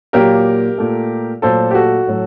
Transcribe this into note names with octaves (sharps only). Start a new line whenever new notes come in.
A#2 F#3 A#3 G4 A#4
A#2 A3
A#2 F#3 A3 A4 C5
G4
F#4 A4
A2 F#3